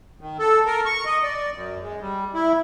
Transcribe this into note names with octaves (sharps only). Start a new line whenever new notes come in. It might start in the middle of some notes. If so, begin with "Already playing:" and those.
D#3
A4
A#4
C#6
D#5
D5
F#2
G#3
G3
E4